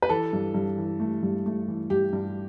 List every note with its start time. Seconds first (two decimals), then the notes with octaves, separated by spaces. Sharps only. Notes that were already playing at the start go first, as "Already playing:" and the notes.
0.02 B4
0.09 E3 A4
0.33 G2
0.54 G2
0.78 E3
1.00 A3
1.23 G2
1.46 A3
1.68 E3
1.90 G2 G4
2.13 G2